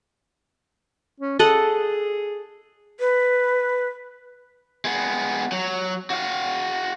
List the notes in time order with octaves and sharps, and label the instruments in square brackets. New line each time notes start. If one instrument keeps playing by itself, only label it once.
[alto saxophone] C#4
[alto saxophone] G#4 [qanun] A4 D#5 F#5
[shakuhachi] B4
[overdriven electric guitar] G#3 B3
F#3
F#4 F5